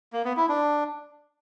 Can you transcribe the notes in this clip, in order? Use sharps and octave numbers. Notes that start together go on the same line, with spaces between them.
A#3
B3
E4
D4